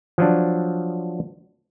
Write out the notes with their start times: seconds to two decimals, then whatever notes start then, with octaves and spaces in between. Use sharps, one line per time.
0.18 F3 F#3 D4